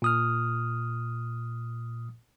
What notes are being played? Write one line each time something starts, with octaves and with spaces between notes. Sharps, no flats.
A#2 D#6 F6